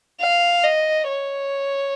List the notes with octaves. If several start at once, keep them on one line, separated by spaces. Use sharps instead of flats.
F5
D#5
C#5